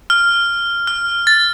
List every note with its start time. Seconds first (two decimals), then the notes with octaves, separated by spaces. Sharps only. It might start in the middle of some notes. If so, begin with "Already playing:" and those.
0.10 F6
0.87 F6
1.27 A6